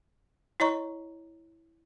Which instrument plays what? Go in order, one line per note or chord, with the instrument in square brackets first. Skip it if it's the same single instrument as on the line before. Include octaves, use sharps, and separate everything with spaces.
[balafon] E4 C#5 D#5 A#5 C#6